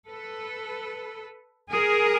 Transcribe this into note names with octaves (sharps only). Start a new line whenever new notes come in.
A4 B4
G#4 A#4